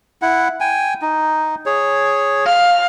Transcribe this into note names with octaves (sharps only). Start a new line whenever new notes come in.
E4 F#5
G5 G#5
D#4
G#4 C#5
F5